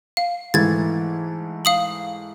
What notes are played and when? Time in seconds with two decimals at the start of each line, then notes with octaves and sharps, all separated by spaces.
0.17 F5
0.54 G#2 E3 A3 G#6 A6
1.65 F5 D#6 F#7